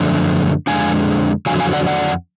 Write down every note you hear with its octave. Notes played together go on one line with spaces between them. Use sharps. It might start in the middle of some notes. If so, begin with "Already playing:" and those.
Already playing: F#2 D3 F3 A3 D4
F2 D3 G#3 D4 F5 G#5
F2 D3 F#3 F5 G#5
F5 G#5
D5 F#5
D5 F#5